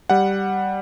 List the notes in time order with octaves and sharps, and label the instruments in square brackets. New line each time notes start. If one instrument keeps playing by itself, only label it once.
[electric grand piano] G3 F#5